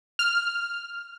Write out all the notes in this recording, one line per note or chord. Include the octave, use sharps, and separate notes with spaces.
F6